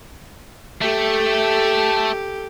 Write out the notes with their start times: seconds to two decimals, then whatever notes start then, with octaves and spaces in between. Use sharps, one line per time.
0.82 A3 G4 A4